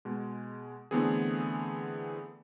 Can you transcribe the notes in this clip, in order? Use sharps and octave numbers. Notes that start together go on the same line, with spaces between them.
B2 G#3
D3 E3 A3 B3 C4 G#4